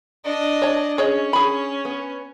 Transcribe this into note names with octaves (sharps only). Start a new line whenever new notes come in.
D4 D#5
C#5 A5
C#4 G#4 C#5 D#5
G#4 B5
B3